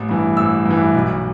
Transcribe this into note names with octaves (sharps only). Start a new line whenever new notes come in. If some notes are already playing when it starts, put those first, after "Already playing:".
Already playing: A1
G2 E3
A1 E6
G2
E3
B1